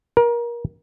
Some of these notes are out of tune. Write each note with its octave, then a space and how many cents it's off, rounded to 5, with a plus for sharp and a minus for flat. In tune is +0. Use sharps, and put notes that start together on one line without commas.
A#4 +25